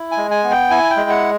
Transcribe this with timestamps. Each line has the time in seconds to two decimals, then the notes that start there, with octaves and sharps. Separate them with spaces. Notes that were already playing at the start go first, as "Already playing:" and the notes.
Already playing: E4
0.11 G#5
0.17 G#3
0.31 G#5
0.44 B3
0.51 G5
0.70 E4 G#5
0.90 G5
0.97 G#3
1.10 F#5